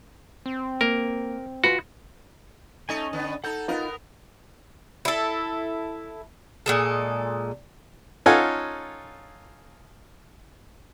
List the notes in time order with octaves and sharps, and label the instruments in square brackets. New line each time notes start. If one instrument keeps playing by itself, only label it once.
[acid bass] C4
[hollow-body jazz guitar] A#3 [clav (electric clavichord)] A#4
[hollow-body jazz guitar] F4 B4 [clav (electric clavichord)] F#4
[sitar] A3 D#4 [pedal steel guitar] C#4 D#5 G#5
[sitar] D3 B3
[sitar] D#4 A4 [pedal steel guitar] F#5 G6
[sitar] B3 A#4 [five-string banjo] D#4 F4
[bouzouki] E4 A4
A#2 G#3 A4
[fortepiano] C#4 D#4 F4 A4 F#5 G#5